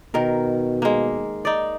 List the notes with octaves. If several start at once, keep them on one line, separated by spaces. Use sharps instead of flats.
B2 D#3 A#4
G#3 A#3
D#4 D5